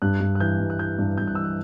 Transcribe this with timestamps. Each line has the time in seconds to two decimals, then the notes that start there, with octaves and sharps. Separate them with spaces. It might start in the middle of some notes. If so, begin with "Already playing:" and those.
0.02 G2 F#6
0.20 G2
0.35 F#6
0.40 E3 G6
0.60 G2
0.70 F#6
0.79 E3 G6
0.99 G2
1.18 G2 G6
1.27 F#6
1.35 E3 E6
1.44 F#6